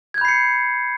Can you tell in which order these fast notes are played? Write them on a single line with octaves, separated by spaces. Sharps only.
G#6 G6 B5 C7 C#7